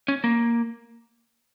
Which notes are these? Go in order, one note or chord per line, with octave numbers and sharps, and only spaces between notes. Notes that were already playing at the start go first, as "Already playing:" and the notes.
C#4
A#3